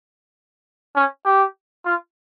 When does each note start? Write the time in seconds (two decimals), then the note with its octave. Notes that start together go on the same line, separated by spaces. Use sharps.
0.96 C#4
1.25 G4
1.85 F4